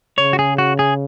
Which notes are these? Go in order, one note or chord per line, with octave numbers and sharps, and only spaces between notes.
C#3 C#5
F#4
G#4
F#4
G#4